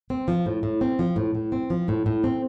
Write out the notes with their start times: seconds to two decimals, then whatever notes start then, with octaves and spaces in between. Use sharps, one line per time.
0.10 C4
0.28 F3
0.46 A2
0.63 A2
0.81 C4
0.99 F3
1.16 A2
1.35 A2
1.52 C4
1.70 F3
1.88 A2
2.06 A2
2.24 C4